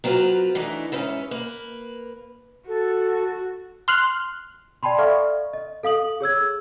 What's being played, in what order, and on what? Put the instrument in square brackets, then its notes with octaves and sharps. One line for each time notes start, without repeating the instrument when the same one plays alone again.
[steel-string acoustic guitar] F#3 C4 F4 A#4 B4
E3 A3 D4 D#4
G#2 C#4 B4 E5
A#3 B4
[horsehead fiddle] F#4 [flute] A4
[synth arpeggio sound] C6 F6 F#6
[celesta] D5 G5 A5 B5 C6
A4 D5 E5 F5 C#6 F6
D#5
A4 F5 D#6 F#7
G#4 C#5 E6 G#6